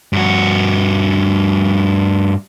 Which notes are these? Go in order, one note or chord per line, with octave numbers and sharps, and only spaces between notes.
G2 F#4